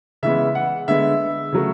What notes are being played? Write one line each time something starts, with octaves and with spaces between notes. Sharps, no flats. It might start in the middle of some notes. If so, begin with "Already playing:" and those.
C#3 E3 G#3 B3 E5
F#5
D3 G#3 B3 E5
C#3 F#3 A3